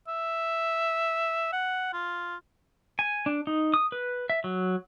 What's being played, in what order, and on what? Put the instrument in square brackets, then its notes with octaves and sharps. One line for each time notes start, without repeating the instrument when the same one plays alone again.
[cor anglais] E5
F#5
F4
[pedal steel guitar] G#5
D4
D#4
D#6
B4
E5
F#3